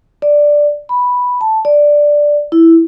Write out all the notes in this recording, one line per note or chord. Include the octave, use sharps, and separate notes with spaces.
D5
B5
A5
D5
E4